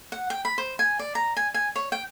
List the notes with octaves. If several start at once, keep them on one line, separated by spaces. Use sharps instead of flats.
F#5
G5
B5
C5
G#5
D5
A#5
G#5
G#5
C#5
G5